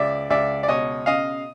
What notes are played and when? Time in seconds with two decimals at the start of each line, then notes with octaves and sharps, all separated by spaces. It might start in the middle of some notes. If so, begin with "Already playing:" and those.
Already playing: C#2 D5 E5
0.30 C#2 D5 E5
0.63 D5
0.68 B2 C#5 D#5
1.06 C#3 D#5 F5